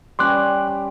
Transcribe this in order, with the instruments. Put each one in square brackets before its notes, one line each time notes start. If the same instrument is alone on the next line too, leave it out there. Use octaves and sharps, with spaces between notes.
[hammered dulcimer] G3 C#4 G5 [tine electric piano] C6 D6 F#6